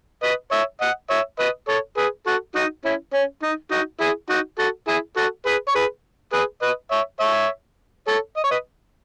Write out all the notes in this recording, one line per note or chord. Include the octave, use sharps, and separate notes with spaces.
B4 D#5
C#5 E5
D#5 F#5
C#5 E5
B4 D#5
A4 C#5
G#4 B4
F#4 A4
D#4 F#4
C#4 E4
C#4
D#4
D#4 F#4
E4 G#4
D#4 F#4
F#4 A4
E4 G#4
F#4 A4
G#4 B4
C#5
G#4 B4
G#4 B4
B4 D#5
C#5 E5
C#5 E5
A4 C#5
D#5
C#5
B4 D#5